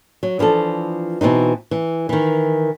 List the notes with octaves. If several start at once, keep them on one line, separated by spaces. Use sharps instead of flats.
F#3
E3 F3 D4 A4
B2 E3 C4 D#4
E3
D#3 E3